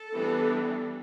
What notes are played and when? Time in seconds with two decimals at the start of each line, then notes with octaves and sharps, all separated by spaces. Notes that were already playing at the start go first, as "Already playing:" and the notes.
Already playing: A4
0.14 E3 G3 B3 D4